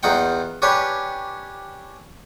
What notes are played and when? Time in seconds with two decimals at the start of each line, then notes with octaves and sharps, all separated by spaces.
0.03 E2 D#4 F4 F#5 G5
0.62 C#4 D4 G4 B4 C#5